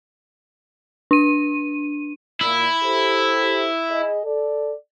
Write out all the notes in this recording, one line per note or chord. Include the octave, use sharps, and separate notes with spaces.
D4 D#7
A#2 E4
G4 A4 C5
G#4 D#5
A4 D5